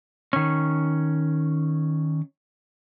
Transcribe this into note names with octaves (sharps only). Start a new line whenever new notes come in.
D#3 C#4